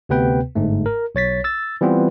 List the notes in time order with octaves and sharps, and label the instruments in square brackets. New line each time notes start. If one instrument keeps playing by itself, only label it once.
[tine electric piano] D2 C3 B3 B4 G5
G1 G#2 A3
A#4
B1 C#5 A6 B6
E6 A6
E3 G3 B3 C4 F4